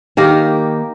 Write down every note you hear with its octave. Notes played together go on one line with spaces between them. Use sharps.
D#3 A#3 G4 A#4